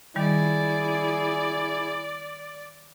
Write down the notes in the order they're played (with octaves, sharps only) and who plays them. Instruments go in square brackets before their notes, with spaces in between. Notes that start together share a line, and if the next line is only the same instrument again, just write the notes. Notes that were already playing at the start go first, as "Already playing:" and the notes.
[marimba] D#3 G3 [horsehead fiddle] E4 G#4 [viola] D5